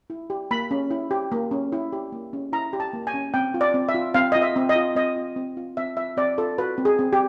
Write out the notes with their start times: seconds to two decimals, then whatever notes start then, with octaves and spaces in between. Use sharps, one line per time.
0.10 E4
0.30 G4
0.51 A#3 B5
0.71 C#4
0.90 E4
1.11 G4
1.32 A#3
1.51 C#4
1.72 E4
1.92 G4
2.12 A#3
2.33 C#4
2.52 E4 A#5
2.73 G4
2.80 A5
2.93 A#3
3.07 G#5
3.14 C#4
3.34 C4 G5
3.54 F4
3.61 D5
3.74 C4
3.89 E5
3.94 F4
4.14 C4 F5
4.32 F4 D#5
4.42 E5
4.56 C4
4.69 D#5
4.76 F4
4.95 C4 D#5
5.16 F4
5.36 C4
5.57 F4
5.77 C4 E5
5.97 F4 E5
6.17 C4 D5
6.38 F4 A4
6.58 F#4 B4
6.78 C4
6.85 G#4
6.99 C4
7.13 G4